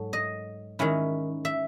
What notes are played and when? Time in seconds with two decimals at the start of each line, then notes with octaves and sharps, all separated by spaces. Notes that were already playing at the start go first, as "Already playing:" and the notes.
Already playing: G#2 F#3 A4
0.13 D#5
0.79 D#3 G#3 C#4 E4
1.45 E5